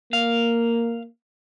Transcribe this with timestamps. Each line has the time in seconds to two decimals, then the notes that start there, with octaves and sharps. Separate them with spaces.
0.13 A#3 F5